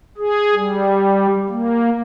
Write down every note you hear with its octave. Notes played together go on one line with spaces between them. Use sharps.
G#4
G3
A#3